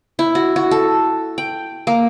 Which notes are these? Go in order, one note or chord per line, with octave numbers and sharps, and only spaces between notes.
E4
F#4
F#4
A4
G5
A#3